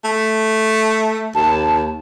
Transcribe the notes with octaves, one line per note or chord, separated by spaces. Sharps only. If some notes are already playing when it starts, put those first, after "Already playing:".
A3
D#2 A5